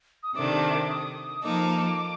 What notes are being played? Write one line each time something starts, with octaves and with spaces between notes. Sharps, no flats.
D#6
C3 D#3 A3 D4 D6
D#6
F3 A#3 D#4 A4 D6